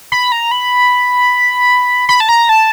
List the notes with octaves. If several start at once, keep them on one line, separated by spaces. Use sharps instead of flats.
B5
A#5
B5
B5
A5
A#5
A5